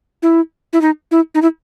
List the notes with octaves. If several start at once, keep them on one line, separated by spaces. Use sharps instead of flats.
E4
E4
D#4
E4
D#4
E4